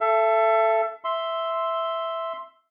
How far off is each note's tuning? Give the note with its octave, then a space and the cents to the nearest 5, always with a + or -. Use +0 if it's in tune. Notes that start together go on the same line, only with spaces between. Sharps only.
A4 +0 E5 +30
E5 +0 C6 +0